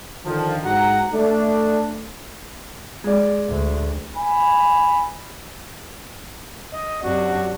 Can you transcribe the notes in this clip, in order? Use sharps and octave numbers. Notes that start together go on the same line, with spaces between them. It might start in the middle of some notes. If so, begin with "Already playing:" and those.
D3 D#3 F3
G#2 F#4 F#5 A#5
A3 D4
G#3 D5
D2
G#5 B5
D#5
F#2 C3 D4 F#4